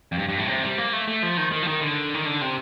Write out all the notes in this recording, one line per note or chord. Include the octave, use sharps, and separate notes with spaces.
F2
G2
G2
A2
C3
G3
A#3
A3
A3
F3
D#3
D#3
F3
D#3
D3
D#3
D3
C3